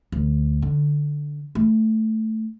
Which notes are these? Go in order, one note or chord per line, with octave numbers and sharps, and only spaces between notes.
D2
D3
A3